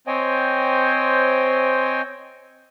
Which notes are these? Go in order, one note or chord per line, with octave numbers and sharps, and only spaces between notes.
C4 C5 C#5 D#5 G5 G#5